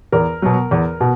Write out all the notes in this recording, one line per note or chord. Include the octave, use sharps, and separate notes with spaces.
E2 A#4
B2 F#3
E2
B2